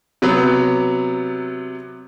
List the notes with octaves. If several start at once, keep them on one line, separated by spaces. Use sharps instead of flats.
C3 F#3 B3